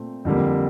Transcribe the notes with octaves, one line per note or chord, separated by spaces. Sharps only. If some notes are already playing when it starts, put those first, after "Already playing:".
Already playing: A#2 A3 C4
F2 D3 G3 A#3